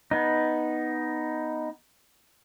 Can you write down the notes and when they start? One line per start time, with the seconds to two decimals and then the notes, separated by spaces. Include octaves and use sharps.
0.11 B3 D#4